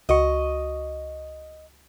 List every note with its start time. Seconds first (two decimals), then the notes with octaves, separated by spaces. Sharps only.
0.09 C#2 F#4 D#5 C#6